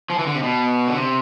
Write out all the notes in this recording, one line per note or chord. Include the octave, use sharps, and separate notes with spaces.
F3
E3
D3
C3
B2
D3
C3